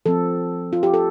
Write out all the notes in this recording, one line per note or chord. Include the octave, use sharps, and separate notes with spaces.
F3 C4 A4
F4
G4
A4